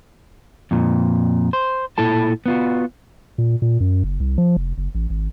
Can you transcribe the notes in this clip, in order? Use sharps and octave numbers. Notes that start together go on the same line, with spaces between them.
F2 A#2
C5
A#2 E4 A4 A5
B3 F4 F#4
A#2
A#2
F#2
F#1
C2
F3
F1
F#1
A1
G#1